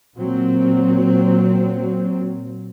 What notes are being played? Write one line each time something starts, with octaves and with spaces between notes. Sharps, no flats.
A#2 F#3 C4